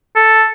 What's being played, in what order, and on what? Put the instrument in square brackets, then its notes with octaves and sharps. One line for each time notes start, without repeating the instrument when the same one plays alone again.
[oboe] A4